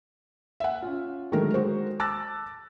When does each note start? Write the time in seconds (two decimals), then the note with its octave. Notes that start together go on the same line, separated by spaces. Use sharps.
0.60 E5 F#5
0.82 C#4 F4
1.32 D3 D#3 F#3 G#3 A3 A#4
1.54 G#3 F#4 C5
2.00 A5 D6 E6 F#6 A6 A#6